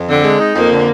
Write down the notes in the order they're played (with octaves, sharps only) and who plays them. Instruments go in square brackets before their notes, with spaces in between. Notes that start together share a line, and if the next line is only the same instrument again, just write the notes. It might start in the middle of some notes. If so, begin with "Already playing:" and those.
Already playing: [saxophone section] F2
[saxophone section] D3 [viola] C4
[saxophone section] G#3
D#4
[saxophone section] F2 [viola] A#3
[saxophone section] D3